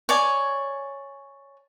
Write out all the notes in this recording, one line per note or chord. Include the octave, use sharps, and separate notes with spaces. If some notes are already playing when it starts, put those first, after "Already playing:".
C#5 D5 G#5